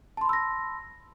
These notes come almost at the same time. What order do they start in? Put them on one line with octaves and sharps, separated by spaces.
A5 C6 B5 E6 A#6